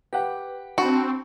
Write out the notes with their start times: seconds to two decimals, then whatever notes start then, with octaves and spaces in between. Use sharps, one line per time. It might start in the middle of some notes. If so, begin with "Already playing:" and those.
0.13 G4 B4 F#5
0.78 C4 D4 F#4 A5 B5